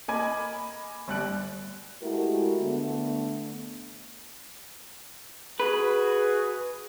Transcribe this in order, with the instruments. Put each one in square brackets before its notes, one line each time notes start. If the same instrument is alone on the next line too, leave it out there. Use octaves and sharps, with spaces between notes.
[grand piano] A#3 D#5 G#5 B5 D6 G#6
G1 G3 F#6 D7
[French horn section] G#3 A3 E4 F#4 G4 A#4
D3 A3 B3
[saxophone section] F#4 G#4 [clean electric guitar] B4